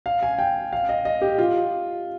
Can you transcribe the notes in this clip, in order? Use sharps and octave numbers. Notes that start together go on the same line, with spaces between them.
F5
G#5
G5
F5
D#5
D#5
G4
F4